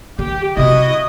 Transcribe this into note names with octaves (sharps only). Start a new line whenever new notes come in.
D#3 G4
C3 C4 E4 F#4 D#5